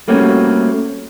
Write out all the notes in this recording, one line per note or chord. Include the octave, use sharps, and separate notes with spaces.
G3 A3 A#3 C4 C#4 F#4